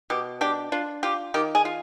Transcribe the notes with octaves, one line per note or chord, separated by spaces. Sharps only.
B2 G4
D4 G4
D4 F4
F4 G4
D#3 G4
G#4
F4